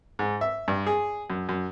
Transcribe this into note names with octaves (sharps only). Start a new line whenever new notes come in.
G#2
E5
G2
G#4
F#2
F#2